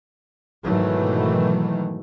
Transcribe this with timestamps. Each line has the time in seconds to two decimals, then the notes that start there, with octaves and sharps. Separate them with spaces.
0.62 G#2 B2 D#3 E3 F#3 A3